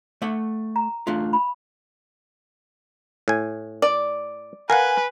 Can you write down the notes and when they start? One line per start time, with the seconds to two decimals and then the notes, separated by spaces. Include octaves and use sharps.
0.22 A3 E5 F#5
0.76 A#5
1.07 A3 D4 F4 F5
1.33 B5
3.28 A2 G#5
3.82 D5
4.70 A#4 B4 F5 F#5 G#5